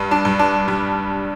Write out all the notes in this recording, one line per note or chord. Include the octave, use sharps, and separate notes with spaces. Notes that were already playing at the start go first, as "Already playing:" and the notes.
Already playing: G2
D4
G2
D4
G3